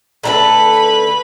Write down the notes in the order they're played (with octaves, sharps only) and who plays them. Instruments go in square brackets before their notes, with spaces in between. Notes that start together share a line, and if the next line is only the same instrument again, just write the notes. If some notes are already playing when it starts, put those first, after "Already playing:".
[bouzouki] D3 A3 A4 [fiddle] B4 B5